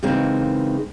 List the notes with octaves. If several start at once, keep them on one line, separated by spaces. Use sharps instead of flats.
C#3 E3 G#3 A#3 C4 D#4